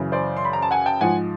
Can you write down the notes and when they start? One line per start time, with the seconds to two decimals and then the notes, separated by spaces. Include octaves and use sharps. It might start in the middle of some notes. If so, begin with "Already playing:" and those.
Already playing: F#2 C#3 E3
0.12 C5 D5
0.37 C6
0.45 B5
0.53 A#5
0.62 A5
0.71 F#5 G#5
0.86 G5 A5
1.01 G#2 F3 F#5 G#5